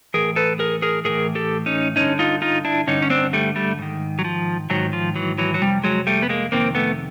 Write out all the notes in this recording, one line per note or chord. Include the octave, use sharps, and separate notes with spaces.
A2 E3 G#4 A#4
A4 B4
G#4 A#4
G#4 A#4
A2 E3 G#4 A#4
G4 A4
C#4 D#4
G2 D3 C#4 D#4
D#4 F4
D#4 F4
D4 E4
G2 D3 C#4 D#4
C#4
C4 D4
G3 A3
G3 A3
G#2 D#3
F#3
F3
G#2 D#3 E3 F#3
F3
E3 F#3
E3 F#3
F#3
F2 C3 G3
F#3 G#3
G3 A3
B3
G#3 A#3
F2 C3 D#3 A#3 C4
A3 B3